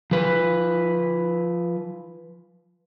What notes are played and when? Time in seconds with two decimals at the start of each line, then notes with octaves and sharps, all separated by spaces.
0.11 F3 B4